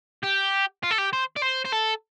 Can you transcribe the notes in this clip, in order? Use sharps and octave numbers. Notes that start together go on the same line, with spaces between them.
G4
F4
A4
G4
C5
D5
C5
C5
A4